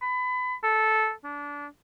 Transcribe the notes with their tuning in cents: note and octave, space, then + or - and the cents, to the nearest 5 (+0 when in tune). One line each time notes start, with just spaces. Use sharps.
B5 +25
A4 -10
D4 -25